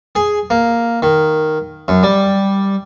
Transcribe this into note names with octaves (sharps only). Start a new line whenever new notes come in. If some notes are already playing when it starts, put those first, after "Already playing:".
G#4
A#3
D#3
F#2
G3